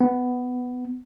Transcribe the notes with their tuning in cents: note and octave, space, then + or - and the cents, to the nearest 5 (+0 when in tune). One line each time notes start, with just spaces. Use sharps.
B3 +10